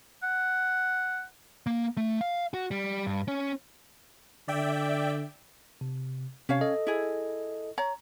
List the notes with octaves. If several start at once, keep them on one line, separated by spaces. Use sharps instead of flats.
F#5
A#3
A3
F5
F#4
G3
G2
C#4
D3 D5 E5 G5
C3
C3 C#4 C#5 F5
A4 D#5
E4 G#4
C#5 A#5